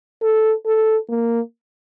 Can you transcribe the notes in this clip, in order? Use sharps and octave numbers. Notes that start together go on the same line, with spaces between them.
A4
A4
A#3